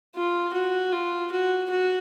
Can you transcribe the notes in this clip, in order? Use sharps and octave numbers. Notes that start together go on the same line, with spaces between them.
F4
F#4
F4
F#4
F#4